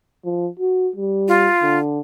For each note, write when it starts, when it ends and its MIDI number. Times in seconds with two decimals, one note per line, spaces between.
0.25 0.48 53
0.59 0.89 66
0.96 1.47 55
1.28 1.79 65
1.63 2.00 50